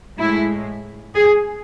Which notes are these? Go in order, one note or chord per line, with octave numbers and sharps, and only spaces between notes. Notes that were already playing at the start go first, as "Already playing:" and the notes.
A2 G#3 E4
G#4